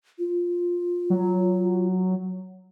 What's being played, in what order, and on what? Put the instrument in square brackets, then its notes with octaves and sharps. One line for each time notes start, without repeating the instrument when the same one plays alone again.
[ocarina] F4
[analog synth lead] F#3